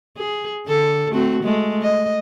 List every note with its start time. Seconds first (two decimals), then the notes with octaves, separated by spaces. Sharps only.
0.17 G#4
0.67 D3 A4
1.12 A3 C4 F#4
1.43 G#3 A3
1.82 D#5